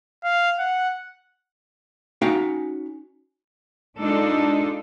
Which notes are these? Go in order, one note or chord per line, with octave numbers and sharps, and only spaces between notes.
F5
F#5
C#4 D#4 F#4 F5 G5
G#3 D4 D#4 F4 A4